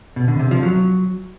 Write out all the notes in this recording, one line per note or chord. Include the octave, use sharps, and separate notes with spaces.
B2
D3
C3
F3
F#3